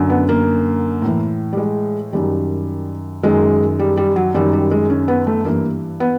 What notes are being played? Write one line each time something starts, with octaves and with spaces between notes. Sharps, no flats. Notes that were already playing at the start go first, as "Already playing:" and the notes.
Already playing: F#2 D3
B3
A#3
A2 E3
G3
G#3
F#2 D#3 G3
F#2 D#3 G#3
G3
G3
F#3
F#2 D#3 G3
G3
G#3
C#4
B3
A3
G2 E3 A#3
B3